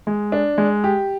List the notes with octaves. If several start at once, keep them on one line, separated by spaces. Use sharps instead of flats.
G#3
D4
G#3
G4